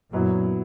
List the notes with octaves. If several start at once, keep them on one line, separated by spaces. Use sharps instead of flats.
F#2 A#2 F#3 B3 E4